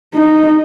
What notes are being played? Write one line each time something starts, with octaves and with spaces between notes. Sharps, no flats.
D#4